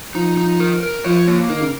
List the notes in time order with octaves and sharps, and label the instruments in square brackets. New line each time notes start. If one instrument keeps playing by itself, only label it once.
[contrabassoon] F3 [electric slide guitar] D#4
[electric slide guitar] D#4
A#4
A#4
[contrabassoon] F3 [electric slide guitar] C#5
[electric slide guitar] A#3
[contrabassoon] D#3 [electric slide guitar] A#4
[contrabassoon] C#3